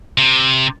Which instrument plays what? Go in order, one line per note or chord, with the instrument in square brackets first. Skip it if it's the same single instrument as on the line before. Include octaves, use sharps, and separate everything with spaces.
[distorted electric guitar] C3